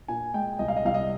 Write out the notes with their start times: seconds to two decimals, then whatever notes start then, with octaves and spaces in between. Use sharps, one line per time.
0.08 A#2 G#5
0.34 G#3 G5
0.59 C2 D#5
0.68 F5
0.76 D#5
0.85 C2 F5
0.94 D#5